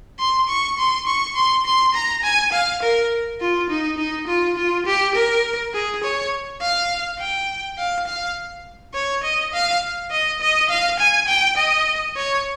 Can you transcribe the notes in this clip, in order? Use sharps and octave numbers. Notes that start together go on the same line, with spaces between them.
C6
C#6
C6
C#6
C6
C6
A#5
G#5
F5
A#4
F4
D#4
D#4
F4
F4
G4
A#4
G#4
C#5
F5
G5
F5
F5
C#5
D#5
F5
D#5
D#5
F5
G#5
G5
D#5
C#5